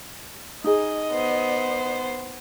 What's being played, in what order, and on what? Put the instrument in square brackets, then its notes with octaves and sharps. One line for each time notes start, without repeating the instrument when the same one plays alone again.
[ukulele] D#4 G#4 [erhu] D#5
[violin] B3 C5